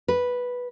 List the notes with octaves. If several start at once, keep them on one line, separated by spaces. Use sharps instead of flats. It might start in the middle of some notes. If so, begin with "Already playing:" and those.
B4